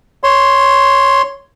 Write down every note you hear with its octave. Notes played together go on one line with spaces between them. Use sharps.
C#5 C6